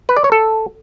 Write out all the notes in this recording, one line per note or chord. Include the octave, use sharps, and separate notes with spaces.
B4
D5
C#5
A4